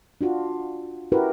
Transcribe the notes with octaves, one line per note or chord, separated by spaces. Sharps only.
D4 F4 F#4
C#4 E4 F#4 G4 A#4 B4